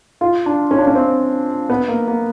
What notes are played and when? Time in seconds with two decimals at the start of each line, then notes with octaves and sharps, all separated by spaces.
0.21 F4
0.46 D4
0.71 C#4
0.78 D4
0.87 C#4
0.95 C4
1.70 B3
1.88 A#3
2.08 A#3